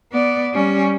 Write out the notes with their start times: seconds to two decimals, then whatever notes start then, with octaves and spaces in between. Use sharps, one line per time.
0.12 B3 D5
0.54 G3 C#4